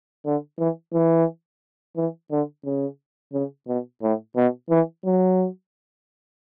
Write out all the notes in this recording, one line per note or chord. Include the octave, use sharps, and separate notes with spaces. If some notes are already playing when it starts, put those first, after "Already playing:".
D3
E3
E3
E3
D3
C#3
C#3
B2
A2
B2
E3
F#3